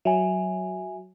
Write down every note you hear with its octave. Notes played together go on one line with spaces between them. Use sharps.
F#3 E5 G#5